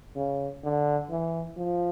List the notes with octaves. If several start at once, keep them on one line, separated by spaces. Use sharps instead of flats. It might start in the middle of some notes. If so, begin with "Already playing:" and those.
C#3
D3
E3
F3